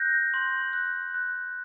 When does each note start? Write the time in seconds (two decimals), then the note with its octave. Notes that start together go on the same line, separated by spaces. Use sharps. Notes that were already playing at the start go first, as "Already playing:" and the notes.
Already playing: F#6 G6 A#6
0.34 C6
0.73 F#6
1.14 F#6